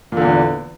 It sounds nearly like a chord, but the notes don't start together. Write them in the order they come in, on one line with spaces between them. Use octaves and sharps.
A#2 D3 E2